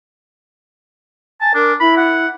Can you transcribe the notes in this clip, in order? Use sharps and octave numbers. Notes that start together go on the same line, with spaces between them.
G#5 A5
D4 A#4
E4 B5
F#5